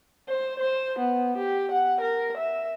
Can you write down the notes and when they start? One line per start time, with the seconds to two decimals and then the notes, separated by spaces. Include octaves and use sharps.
0.29 C5
0.59 C5
0.99 B3
1.37 G4
1.72 F#5
2.01 A#4
2.38 E5